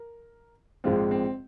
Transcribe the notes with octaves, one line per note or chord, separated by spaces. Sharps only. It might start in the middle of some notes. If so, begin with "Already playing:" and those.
Already playing: A#4
A#1 G#2 F3 G#3 C4 F4
C4